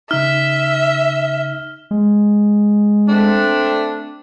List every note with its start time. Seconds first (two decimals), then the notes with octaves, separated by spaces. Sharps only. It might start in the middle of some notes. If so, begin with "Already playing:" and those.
0.11 C#3 D#4 E5 F6
1.91 G#3
3.08 A3 C4 D4